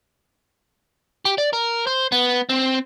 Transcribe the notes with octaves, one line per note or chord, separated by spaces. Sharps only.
G4
D5
A#4
C5
B3
C4